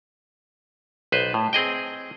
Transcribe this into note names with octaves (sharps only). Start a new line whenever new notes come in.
B1 B4 C5
A2
C4 G#4 D#5 G5